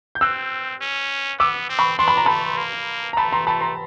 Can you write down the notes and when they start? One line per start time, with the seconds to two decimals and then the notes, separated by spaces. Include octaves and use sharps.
0.15 G6
0.21 C4 E6 F#6
0.81 C#4
1.39 B3 D6 E6
1.69 C4
1.79 B5 C#6
1.98 D4 C6
2.08 B5
2.17 A#5
2.26 A3 A5 B5
2.57 A#3
3.13 A#5
3.17 A3 A5 B5
3.32 A#5 C6
3.47 A3 A5 B5
3.61 A#5 C6